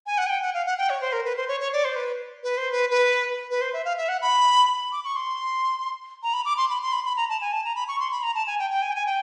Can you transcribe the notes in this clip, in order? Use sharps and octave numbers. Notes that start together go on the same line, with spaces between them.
G#5
F#5
G#5
G5
F#5
F5
F#5
G5
C#5
C5
A#4
B4
C5
C#5
C#5
D5
C5
B4
B4
C5
B4
B4
B4
C5
E5
F5
E5
F#5
B5
D6
C#6
C6
A#5
B5
D6
C6
B5
C6
B5
B5
A#5
A5
G#5
A5
A#5
B5
C#6
C6
B5
A#5
A5
G#5
G5
G5
G#5
G5
G#5
G5